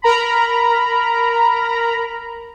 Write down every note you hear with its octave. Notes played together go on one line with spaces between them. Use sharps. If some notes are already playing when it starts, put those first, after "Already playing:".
A#4 A#5 B5